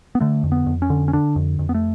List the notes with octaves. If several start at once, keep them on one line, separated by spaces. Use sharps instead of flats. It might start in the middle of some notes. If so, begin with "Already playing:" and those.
B3
D3 A3
F2
B3
F2
C#4
D3
C#4
D3 D4
F2
F2
B3
A3